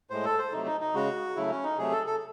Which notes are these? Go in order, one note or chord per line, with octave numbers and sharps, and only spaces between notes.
A2 G#3 C5
A4
C5
C3 F#3 A3 D#4
D#4
D#4
C#3 G#3 F#4
C#3 F#3 A3 E4
C#4
D#4
C3 F#3 A3 G#4
A4
A4